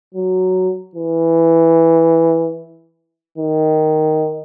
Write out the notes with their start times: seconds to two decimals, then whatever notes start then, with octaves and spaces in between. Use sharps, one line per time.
0.15 F#3
0.95 E3
3.38 D#3